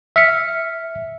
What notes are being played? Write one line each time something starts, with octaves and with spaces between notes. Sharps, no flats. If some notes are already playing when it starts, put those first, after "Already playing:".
E5 F6 B6 C#7